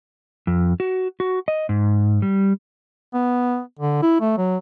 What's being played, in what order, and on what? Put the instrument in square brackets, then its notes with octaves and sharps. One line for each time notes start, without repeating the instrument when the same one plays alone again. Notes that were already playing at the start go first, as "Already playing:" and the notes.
[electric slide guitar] F2
F#4
F#4
D#5
G#2
G3
[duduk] B3
D3
E4
A3
F#3